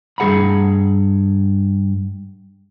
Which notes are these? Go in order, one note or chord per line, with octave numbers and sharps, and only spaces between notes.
G2 G#4 F#5 A#5 B5